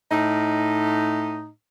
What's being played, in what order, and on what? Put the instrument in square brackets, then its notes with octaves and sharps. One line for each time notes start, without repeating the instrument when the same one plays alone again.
[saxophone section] A2 D#4